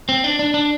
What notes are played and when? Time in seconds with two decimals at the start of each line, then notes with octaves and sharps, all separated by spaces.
0.09 C4
0.24 D4
0.39 D4
0.54 D4